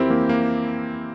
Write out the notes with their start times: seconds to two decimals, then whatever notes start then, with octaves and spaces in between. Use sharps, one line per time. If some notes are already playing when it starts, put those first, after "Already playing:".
Already playing: F2 E3 C4 E4 G4 A#4
0.10 E3 A#3
0.29 A#3